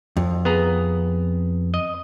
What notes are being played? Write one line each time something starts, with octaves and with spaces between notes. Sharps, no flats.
F2
B3 G#4 A#5
D#5